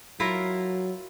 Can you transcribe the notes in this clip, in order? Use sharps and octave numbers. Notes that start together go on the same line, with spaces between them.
F#3 E4 F4 A#4